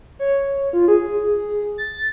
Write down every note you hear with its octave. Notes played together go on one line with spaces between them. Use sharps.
C#5
F4
G#4
A6